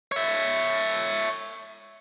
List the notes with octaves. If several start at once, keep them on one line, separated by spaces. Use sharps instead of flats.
C#5 E5